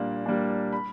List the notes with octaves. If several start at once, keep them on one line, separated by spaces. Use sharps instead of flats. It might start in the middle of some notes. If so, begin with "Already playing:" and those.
Already playing: A#2 G3 A#3 D4
G3 A#3 D4
B5